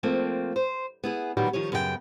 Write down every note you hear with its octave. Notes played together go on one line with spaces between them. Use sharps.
F3 A3 A#3 C4
C5
B3 E4 G#4
A#2 D#3 F#3 G3 B3
D#3 F3 D#4 C#5
F#2 C#3 B3 F#4 G5